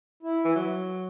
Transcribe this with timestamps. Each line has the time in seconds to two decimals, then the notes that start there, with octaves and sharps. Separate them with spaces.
0.23 E4
0.45 E3
0.55 F#3